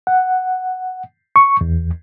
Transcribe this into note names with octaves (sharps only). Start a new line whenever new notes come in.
F#5
C#6
E2